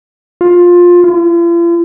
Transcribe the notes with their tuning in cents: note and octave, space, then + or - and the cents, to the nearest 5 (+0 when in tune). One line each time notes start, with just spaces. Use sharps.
F4 +15
F4 -45